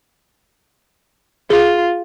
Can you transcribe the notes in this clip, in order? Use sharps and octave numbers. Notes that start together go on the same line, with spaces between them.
F4 G#4